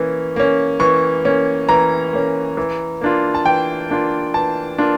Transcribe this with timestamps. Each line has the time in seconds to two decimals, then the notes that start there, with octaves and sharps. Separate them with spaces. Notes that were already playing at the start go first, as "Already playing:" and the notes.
Already playing: E3 A#3 C#4
0.36 A#3 C#4
0.80 E3 C#6
1.25 A#3 C#4
1.69 E3 A#5
2.13 A#3 C#4
2.57 E3
3.01 A#3 D4 F4
3.35 A5
3.45 E3 G5
3.90 A#3 D4 F4
4.34 E3 A5
4.78 A#3 D4 F4